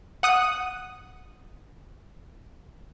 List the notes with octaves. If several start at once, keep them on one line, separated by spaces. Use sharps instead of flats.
F#5 D#6 F#6